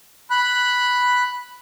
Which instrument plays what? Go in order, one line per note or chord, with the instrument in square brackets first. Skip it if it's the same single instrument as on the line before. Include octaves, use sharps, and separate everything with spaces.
[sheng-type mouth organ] B5 F#6